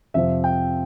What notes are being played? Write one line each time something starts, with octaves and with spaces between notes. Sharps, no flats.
F2 C3 F3 C4 E5
G5